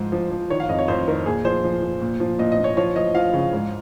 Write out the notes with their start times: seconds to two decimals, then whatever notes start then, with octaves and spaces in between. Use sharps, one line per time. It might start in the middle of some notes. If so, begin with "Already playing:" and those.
Already playing: G#2 F3 C5
0.12 F3
0.31 F3
0.50 D#3 C#5
0.60 F5
0.69 F2 D#5
0.79 C#5
0.88 F2 C5
1.07 D#3 A#4
1.26 A#2 G#4
1.44 F3 C5
1.64 F3
1.82 F3
2.02 A#2
2.20 F3
2.39 A#2 D#5
2.52 D#5
2.58 A#2
2.64 C#5
2.77 F3 C#5
2.96 F3 D#5
3.15 F3 F5
3.33 C#3
3.53 G#2